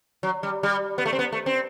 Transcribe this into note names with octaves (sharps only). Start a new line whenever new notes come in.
F#3
G3
G3
B3
A3
C4
B3
A3
C4